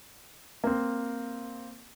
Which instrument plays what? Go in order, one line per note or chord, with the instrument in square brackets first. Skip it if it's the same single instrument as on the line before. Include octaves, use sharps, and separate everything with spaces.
[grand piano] A#3 C4